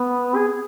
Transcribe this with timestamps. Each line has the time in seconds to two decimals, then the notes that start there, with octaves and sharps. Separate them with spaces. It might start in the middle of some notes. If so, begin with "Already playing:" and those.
Already playing: B3
0.35 G#4